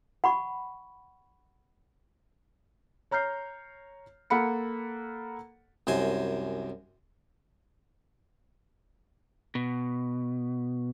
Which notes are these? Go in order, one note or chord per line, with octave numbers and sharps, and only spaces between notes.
F#5 B5 C#6
C#5 A#5 F6 G6 C7
A#3 A4 F#5 B5 C#7
C2 F#2 C5 G#5
B2